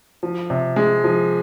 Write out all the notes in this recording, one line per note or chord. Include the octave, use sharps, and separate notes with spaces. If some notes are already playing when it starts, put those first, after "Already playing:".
F3
C3
G#3
F3